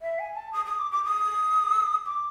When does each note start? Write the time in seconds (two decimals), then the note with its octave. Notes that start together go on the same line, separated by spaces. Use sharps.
0.02 E5
0.19 G#5
0.36 A5
0.53 D#6
0.66 D#6
0.79 D6
0.91 D6
1.04 D#6
2.06 D6